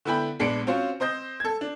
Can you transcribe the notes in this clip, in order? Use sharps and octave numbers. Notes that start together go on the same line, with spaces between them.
D3 B3 E4 G5 B5
A#1 G#3 B3 D4 C#7 D7
C4 C#4 F4 F#4 C5
C4 C5 D#5 G6
A4 G#6
D4